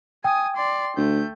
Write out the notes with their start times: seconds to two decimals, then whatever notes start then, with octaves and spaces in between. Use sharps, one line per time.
0.24 G5 G#5 D#6
0.56 D5 C6
0.97 D2 A3 G6